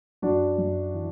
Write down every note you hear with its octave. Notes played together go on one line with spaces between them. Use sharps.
F#2 D4 F#4
F#2
E3